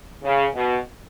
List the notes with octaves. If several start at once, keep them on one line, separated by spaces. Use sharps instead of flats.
C#3
B2